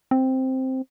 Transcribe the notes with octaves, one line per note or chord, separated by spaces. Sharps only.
C4